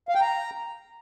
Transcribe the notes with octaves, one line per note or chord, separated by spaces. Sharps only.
F5
G5
A#5